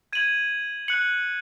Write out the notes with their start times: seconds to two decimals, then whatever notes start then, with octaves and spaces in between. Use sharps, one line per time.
0.13 G#6 D#7 F#7
0.88 F#6 C#7 F#7